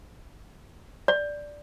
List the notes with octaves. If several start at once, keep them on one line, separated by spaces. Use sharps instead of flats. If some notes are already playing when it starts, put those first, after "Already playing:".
D5